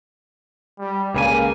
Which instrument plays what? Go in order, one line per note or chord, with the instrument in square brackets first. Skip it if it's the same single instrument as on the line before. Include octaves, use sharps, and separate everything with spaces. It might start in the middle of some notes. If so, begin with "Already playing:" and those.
[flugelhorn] G3
[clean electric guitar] C#2 C#3 G#5 [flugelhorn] A#3